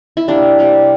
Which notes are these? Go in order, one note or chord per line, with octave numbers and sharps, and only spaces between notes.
E4
C3 G3 A#3 D4
C3 G3 A#3